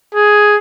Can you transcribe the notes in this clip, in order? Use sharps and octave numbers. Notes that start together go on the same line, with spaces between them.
G#4